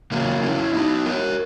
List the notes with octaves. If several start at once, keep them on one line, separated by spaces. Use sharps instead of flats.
E2 C#3 F#3 A#3 C#4
C#4 E4
B3 D#4
A#4 C#5